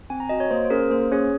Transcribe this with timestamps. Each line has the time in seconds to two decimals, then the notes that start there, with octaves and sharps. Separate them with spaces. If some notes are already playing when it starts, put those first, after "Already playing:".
0.10 C4 G#5
0.20 A#5
0.29 F#4 D#5
0.40 C#5
0.51 A#3 C5
0.64 C5
0.70 C#4 G#4 A#4
0.90 A#3 C5
1.11 C#4 G#4 C#5